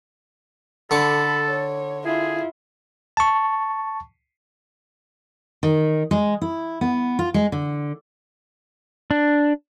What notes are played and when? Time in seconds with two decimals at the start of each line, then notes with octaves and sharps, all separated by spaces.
0.91 D3 A4 B5 C#6 D6
1.49 C#5
2.05 E4 F4 G#4
3.17 A5 C#6
5.63 D#3
6.11 G#3
6.42 E4
6.81 B3
7.19 F4
7.34 G#3
7.52 D3
9.11 D4